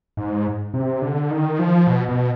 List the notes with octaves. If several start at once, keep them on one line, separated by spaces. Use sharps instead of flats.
G#2
C3
D3
D#3
F3
B2
B2